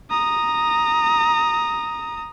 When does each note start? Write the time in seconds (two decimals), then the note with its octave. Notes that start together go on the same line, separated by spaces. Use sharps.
0.11 A#5 D#6